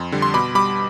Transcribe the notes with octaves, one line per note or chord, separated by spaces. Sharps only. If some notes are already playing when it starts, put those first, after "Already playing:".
Already playing: F2 C6
D3 G3
C6
B2 B5 D6
G3 B5 D6